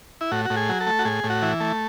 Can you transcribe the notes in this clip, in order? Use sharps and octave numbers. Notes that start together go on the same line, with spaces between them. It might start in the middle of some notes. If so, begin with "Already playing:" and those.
E4
A2 F#4
A2 F#4
G#4
F#3
A4
A3
F#4
A2 G#4
A2
F#4
E3
A3